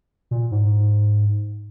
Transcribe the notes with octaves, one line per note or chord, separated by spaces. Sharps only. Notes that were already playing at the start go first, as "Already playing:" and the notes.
A#2
G#2